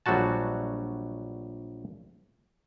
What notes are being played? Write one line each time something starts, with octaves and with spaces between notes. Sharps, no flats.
A#1 F#3 G3 F#4 A5